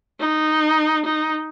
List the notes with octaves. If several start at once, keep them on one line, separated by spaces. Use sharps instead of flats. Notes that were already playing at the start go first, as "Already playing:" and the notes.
D#4
D#4